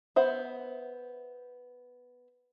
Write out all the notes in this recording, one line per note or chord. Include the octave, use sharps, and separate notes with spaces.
B3 C5 E5